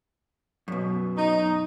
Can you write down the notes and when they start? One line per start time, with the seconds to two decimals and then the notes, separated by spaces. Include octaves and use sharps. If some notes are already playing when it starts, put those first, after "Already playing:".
0.68 F#2 B2
1.17 D#4